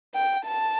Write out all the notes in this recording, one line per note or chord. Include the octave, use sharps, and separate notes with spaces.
G5
A5